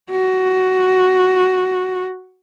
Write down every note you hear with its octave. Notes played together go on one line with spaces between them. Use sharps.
F#4